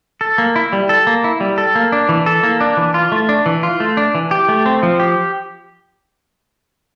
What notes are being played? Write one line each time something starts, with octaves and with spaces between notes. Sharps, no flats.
A4
A#3
E4
G3
A4
A#3
E4
G3
A4
A#3
D4
E3
A4
A#3
D4
E3
F4
A3
D4
E3
F4
A3
D4
E3
G4
A3
C4
F3
G4